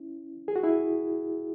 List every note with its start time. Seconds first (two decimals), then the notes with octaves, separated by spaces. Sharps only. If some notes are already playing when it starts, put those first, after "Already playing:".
Already playing: C#4 E4
0.48 G#4
0.56 F#4
0.64 E4 G#4